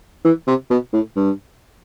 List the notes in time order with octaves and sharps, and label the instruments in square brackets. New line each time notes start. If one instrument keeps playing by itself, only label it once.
[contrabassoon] E3
C3
B2
A2
G2